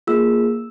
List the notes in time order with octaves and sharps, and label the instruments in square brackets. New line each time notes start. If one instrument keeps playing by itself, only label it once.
[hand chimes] A#3 F4 G#4 E6